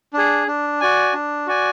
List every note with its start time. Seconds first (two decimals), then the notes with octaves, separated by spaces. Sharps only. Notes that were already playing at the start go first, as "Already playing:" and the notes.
0.13 D4 G#4
0.47 D4
0.81 F#4 D5 G#5
1.14 D4
1.47 F#4 D5 G#5